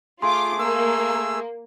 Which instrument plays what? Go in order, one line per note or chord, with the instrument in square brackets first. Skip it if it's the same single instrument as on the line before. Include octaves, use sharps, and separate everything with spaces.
[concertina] A3 G#4 [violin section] F4 D6 [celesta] C6
[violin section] A#3 [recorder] E6